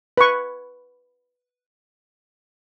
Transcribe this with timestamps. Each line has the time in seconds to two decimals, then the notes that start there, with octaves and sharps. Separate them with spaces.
0.17 B4 C#6